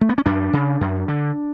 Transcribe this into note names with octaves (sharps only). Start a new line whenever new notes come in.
A3
B3
C#4
F#2 D4
C#3
F#2
D3